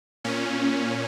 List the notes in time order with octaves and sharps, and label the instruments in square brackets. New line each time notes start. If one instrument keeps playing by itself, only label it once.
[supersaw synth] A#2 C#4